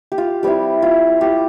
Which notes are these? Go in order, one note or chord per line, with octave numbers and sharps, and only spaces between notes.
G4
F4
G3 C4 E4 G4
F4
G4